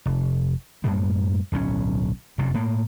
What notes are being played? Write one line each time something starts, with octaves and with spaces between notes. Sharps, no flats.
F1
F#2 A2 G3 A#3
D1 B1 A#2 C#4
F1 F#2 C3
A2 A#3